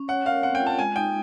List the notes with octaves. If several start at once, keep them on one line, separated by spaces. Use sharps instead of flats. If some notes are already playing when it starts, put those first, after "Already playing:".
Already playing: C#4
C#5 F#5
A#4 F5
C4 F#5
G5
F4
A5
G#3 G#5
D#4 G5